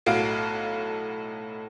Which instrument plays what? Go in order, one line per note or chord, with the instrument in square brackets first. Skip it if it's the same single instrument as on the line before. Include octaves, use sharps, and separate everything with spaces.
[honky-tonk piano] B1 A2 F#4 F5 D7